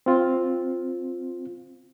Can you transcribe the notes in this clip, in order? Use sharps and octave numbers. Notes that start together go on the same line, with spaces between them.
C4 F4